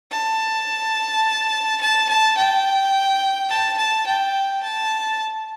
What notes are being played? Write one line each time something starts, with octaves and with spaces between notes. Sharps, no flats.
A5
A5
A5
G5
A5
A5
G5
A5